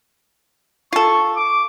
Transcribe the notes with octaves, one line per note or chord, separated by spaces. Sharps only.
F4 A4 C#6
D6